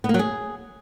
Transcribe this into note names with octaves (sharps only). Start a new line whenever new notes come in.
B3
A#3
F#3
G#4